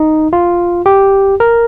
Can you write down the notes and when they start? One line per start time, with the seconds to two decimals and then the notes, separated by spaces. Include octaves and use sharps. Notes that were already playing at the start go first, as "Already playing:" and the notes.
Already playing: D#4
0.33 F4
0.86 G4
1.40 A#4